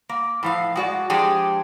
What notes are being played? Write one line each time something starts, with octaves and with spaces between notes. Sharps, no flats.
A#3
A2 F3 F5
G#3 F#4 D5
F3 G#3 D4 G4 G#4